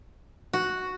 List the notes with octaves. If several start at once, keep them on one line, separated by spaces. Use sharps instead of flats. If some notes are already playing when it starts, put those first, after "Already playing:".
F#4